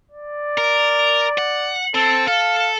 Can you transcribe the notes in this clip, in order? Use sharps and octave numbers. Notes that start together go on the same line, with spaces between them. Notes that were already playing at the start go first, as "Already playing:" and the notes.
D5
A#4
F#5
C4 A4
A4 F5